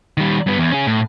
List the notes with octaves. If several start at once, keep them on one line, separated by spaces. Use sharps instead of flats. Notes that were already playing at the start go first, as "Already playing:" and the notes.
D#3 G3
G2 B3
E2
C#4 G#4
A2